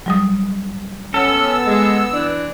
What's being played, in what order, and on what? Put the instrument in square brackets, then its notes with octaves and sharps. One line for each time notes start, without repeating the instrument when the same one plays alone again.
[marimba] F#3 G3 D#6
[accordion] B3 E6 [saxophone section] C#4 [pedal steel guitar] A4
[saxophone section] G#3
E3 D4